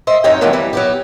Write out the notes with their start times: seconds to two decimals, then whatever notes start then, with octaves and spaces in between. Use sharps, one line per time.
0.07 C5 D#5 E5
0.24 F#2 C4 D#4 C#5 D#5 G5
0.41 D3 D#3 F3 F#3 A#3 C4
0.53 E3 G3
0.73 F#3 B3 G4